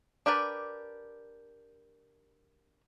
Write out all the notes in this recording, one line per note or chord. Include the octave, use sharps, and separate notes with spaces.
D4 G4 A#4 B4 D5